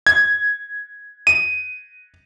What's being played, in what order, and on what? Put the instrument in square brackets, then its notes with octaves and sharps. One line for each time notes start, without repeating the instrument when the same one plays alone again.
[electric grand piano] G#6
D#7